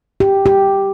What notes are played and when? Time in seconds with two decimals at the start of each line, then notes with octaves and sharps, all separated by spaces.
0.20 G4
0.46 G4